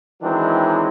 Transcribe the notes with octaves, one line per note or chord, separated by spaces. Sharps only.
D#3 E3 F#3 G#3 C4 D4